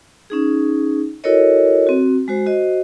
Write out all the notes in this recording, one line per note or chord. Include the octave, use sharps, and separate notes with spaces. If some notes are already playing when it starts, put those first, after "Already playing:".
C#4 D#4 G#4
E4 F#4 A4 A#4 C#5 D#5
C4 F#4
G#3 F#4 C5
F#4 C5 D#5